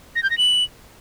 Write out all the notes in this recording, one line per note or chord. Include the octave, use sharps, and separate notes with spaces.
A#6
G6
A#6
F#7